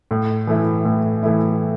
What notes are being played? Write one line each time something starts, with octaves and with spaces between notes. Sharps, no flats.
A2
E3 A3 E4
A2
E3 A3 E4